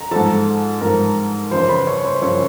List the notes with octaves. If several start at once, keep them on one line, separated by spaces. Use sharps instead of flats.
A#5
G#2 F3 A4 A5
G#2 F3 A#4 A#5
F#2 C#3 F3 C5 C6
B4 B5
C#5 C#6
C5 C6
F#2 C#3 F3 C#5 C#6